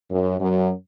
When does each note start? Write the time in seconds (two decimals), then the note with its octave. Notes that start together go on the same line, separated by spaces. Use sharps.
0.11 F#2
0.40 F#2